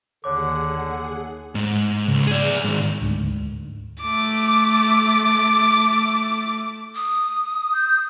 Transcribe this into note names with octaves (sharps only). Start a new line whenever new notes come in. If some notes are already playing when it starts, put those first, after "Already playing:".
D#2 D3 G#4 C#5 F#5 D6
G#2
C#2
G#4 D5
G#2 D#3
D2 G#2 D3
A3 D6
D#6
G6